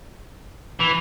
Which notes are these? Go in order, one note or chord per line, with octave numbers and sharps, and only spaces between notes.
E3